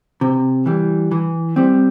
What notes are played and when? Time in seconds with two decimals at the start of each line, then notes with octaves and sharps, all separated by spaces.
0.21 C3
0.66 E3 G3
1.11 E3
1.56 G3 C4